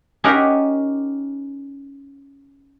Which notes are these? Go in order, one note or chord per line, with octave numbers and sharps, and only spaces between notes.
C#4 D#4 G4 A#4 F#5 B5